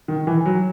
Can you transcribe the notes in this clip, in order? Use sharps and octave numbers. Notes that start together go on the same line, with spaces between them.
D#3
E3
F#3